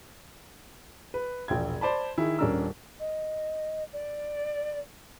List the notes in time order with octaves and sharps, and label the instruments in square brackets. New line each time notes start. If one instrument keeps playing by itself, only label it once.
[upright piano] B4
E1 A#1 G5 G#6
C5 D5 A5 B5
D#3 E4 G#4
D#1 C#4 D4 A#4 E6
[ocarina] D#5
D5